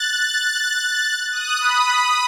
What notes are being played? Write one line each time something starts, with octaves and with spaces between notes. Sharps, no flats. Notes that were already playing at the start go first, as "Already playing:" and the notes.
Already playing: F#6 A6
D#6 F#6
B5 D#6